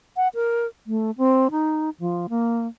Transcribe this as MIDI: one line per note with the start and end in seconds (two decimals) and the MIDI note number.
0.17 0.28 78
0.35 0.67 70
0.87 1.11 57
1.18 1.48 60
1.51 1.90 63
2.00 2.27 53
2.29 2.67 58